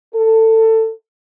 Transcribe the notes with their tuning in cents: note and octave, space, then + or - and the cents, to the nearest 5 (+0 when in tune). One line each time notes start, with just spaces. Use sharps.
A4 +20